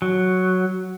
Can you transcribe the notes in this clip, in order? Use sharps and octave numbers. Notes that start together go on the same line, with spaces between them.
F#3